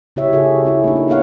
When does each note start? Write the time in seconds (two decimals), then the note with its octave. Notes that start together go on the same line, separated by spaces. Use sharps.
0.16 C#3 E4 G4 C#5 E5
0.33 F#4 G#4 A4
0.65 C#4 E4 F#4
0.84 A#3 D4 D#4
0.96 G4
1.08 B3 A4 C#5 F5 F#5